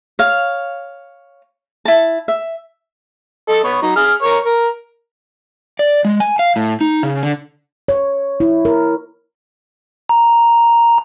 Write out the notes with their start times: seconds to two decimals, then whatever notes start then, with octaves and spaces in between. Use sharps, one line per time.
0.19 C#5 F5
1.85 E4 A5
2.28 E5
3.48 A4 D#5
3.64 B3 C#5
3.82 F#3 D#4
3.96 G#4 F6
4.22 A#4 C#5 C#6
4.45 A#4
5.79 D5
6.05 G#3
6.20 G#5
6.39 F5
6.56 A2
6.81 D#4
7.03 C#3
7.23 D3
7.88 C#5
8.40 E4
8.65 A#4
10.09 A#5